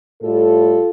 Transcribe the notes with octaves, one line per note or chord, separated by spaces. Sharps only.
A2 G3 F4 A4